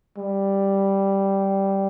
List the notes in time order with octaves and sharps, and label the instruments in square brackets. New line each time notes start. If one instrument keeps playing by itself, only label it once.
[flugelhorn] G3